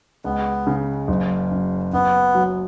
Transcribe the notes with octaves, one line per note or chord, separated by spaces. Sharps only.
C#2 B3
C#3
F#1
F#2
F#2 B3
F#3